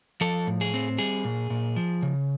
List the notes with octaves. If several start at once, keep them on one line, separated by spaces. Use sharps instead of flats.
F3 A4
A2
G#4
C4
G3 G#4
A#2
A#2
F3
C#3